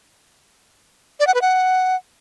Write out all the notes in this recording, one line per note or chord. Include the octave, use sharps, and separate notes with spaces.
D5
F#5
B4
F#5